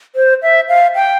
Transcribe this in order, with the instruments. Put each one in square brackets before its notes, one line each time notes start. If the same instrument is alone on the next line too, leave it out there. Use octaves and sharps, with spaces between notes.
[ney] C5
E5
F5
G5